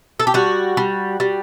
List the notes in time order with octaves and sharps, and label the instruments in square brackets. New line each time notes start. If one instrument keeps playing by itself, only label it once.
[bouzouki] A4
G4
G3 F#4
G3
G3